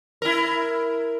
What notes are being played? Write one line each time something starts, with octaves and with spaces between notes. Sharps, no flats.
E4 A#4